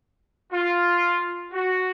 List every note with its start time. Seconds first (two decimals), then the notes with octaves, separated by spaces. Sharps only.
0.52 F4
1.52 F#4